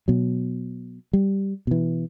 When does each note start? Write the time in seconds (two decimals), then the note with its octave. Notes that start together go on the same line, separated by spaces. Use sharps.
0.08 B2 F#3
1.13 G3
1.67 B2 E3